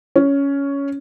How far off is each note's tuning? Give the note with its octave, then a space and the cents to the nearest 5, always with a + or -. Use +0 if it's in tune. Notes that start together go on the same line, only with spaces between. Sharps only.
C#4 +10